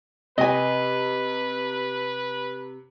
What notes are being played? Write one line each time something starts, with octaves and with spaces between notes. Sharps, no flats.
C3 B4 D#5 G#5